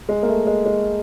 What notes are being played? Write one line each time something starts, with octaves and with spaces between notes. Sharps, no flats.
G#3
A#3
A3
G#3
G#3